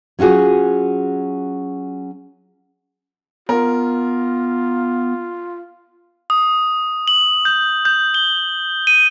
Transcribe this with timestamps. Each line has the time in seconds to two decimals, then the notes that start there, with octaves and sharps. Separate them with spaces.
0.19 F#3 C#4 F4 F#4 G#4
3.49 B3 F4 A#4
6.30 D#6
7.08 F#7
7.45 G6
7.85 G6
8.14 G7
8.87 D#7